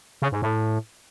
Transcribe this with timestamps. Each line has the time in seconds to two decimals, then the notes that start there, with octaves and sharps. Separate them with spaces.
0.22 C#3
0.32 G#2
0.42 A2